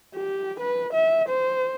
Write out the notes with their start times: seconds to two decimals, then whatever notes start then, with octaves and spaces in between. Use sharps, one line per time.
0.15 G4
0.60 B4
0.93 E5
1.29 C5